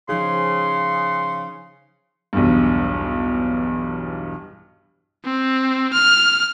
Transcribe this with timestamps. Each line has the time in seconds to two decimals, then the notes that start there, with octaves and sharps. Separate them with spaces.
0.09 C#3 F3 D#4 G#4 C6
2.33 B1 E2 G2
5.25 C4
5.93 F6